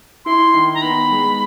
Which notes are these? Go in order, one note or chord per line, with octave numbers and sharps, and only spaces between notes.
E4 C6
D#3
A#5
B3 B5
G#3